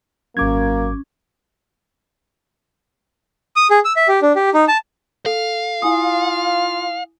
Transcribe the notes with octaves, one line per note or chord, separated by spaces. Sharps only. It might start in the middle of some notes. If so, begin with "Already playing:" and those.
G#1 F#2 A#3 C#4 D6 G#6
D#6
G#4
E6
E5
G4
D4
G4
D#4
A5
A4 F5
E4 F4 G#5 D#6